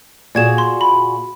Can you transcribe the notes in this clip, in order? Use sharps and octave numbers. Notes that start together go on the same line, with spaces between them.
A#2 F#4 G#4 D5 G#6 E7
C6
B5